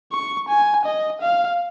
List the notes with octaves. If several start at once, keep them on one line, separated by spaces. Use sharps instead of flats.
C#6
G#5
D#5
F5